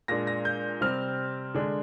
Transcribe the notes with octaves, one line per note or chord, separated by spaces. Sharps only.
A#2 G#3 D4 A#6
A#6
G6
C3 G3 C4 F6
D3 G#3 D4